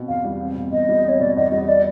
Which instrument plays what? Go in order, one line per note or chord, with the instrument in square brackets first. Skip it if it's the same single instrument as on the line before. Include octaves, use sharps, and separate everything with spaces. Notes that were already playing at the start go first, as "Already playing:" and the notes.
Already playing: [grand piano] B2 C4
[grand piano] E2 [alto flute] F5
[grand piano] G3
C4
B2
[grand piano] E2 [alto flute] D#5
[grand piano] G3
[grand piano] C4 [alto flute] C#5
[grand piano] B2 [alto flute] D5
[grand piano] E2 [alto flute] D#5
[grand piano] G3 [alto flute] D#5
[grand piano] B3 [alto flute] D5